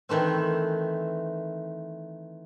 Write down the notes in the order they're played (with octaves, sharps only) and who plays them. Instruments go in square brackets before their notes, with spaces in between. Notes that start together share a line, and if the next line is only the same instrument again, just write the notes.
[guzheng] D#3 E3 A3 C4